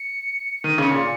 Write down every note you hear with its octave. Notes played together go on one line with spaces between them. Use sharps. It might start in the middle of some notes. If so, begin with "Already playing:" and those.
Already playing: C#7
D#3 D#7
C#3 C#7
A#2